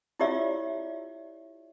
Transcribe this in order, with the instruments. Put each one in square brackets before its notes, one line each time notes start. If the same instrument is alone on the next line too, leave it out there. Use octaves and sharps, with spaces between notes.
[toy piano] E4 F4 G4 C#5 D5 E5